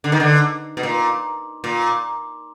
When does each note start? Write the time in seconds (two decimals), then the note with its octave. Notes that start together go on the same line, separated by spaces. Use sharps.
0.04 D3
0.12 D#3
0.20 D3
0.77 B2
0.83 A#2
1.64 A#2